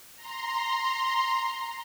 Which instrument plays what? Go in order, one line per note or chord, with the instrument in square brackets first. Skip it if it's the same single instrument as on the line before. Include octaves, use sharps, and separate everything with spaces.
[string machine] A#5 C6